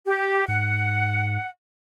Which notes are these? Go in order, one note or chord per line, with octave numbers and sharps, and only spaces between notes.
G4
G#2 F#5